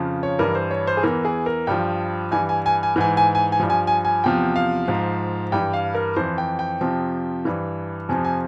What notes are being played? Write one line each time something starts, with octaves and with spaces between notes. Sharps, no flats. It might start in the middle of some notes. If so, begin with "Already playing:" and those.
Already playing: F2 C#3 F3
C#5
G2 E3 A#4
C5
C#5
C5
G#4
E2 E3 A#4
G#4
A#4
G2 F3 G5
G2 E3 G#5
G#5
G#5
G#5
G#2 E3 G#5
G#5
G#5
G#5
G2 F3
G#5
G#5
G#5
E2 C3 F3 G5
F5
G#2 F3
G2 E3 G5
F5
A#4
F2 E3 C5
G5
G5
F2 C3 F3
G2 E3
F2 C3 F3 G#5
G#5